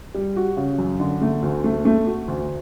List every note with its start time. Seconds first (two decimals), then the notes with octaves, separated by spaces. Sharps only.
0.15 G3
0.36 F#4
0.57 C#3
0.79 F#2
1.00 D3
1.22 A3
1.42 D2
1.64 A3
1.85 A3
2.07 F#4
2.28 D2